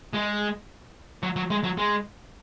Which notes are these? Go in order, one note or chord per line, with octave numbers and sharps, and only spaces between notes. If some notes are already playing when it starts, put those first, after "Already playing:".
G#3
F#3
F#3
G#3
F#3
G#3